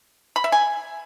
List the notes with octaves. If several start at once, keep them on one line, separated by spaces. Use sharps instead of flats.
B5
E5
G#5